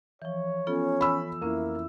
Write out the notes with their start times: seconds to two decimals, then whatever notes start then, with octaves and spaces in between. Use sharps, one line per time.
0.22 E3 F3 C#5
0.67 B3 C#4 F4 A4
1.01 E3 G#5 B5 E6 F6
1.42 F2 A#3 C#4 E4